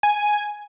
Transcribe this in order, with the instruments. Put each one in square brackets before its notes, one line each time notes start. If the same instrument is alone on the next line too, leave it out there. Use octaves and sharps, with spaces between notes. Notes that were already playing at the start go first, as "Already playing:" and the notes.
[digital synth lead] G#5